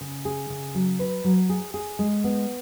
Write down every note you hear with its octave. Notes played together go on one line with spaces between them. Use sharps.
C#3
G#4
C#3
F#3
B4
F#3
G#4
G#4
G#3
B3